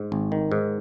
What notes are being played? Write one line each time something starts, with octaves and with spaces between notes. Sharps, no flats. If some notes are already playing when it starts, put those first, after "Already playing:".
Already playing: G#2
G#1
D#3
G#2